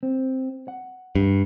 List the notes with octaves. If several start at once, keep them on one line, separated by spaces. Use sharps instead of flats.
C4
F#5
G2